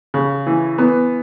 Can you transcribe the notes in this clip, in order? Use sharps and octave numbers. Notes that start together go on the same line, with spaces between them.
C#3
E3
B3